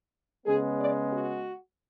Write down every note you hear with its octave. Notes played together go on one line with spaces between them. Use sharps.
C#3 G#3 B3 G#4
D5
F#4